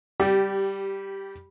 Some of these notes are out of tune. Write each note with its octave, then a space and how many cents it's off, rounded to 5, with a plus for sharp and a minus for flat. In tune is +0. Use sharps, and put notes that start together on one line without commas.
G3 +0 G4 -20